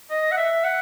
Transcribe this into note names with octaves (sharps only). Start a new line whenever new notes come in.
D#5
F#5
E5
F#5